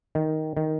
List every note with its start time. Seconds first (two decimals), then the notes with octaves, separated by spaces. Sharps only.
0.15 D#3
0.57 D#3